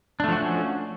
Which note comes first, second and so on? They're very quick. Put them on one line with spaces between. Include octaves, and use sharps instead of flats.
D4 A3 F3 F#4 C#4